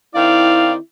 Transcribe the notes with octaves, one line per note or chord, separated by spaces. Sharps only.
D#3 C4 E4 D5 F5